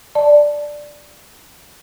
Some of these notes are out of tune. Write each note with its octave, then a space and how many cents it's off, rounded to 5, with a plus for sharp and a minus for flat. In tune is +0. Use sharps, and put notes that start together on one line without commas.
D5 +0 A5 +0